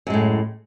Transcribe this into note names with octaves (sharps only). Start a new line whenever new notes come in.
F#2 A2 G#3